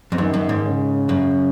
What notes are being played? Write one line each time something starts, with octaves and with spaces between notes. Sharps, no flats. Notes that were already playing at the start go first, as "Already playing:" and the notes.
F2
F#2 D#3
F#2
G#2
C#3
F#2